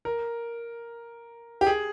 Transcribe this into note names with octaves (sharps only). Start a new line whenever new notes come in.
A#4
G4
G#4